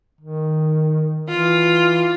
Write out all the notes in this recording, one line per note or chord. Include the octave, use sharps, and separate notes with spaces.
D#3
E3 F4